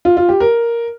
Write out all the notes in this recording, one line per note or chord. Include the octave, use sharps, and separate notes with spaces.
F4
F4
G4
A#4